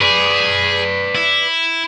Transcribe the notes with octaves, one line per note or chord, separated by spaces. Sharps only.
G#4 B4 D5
E4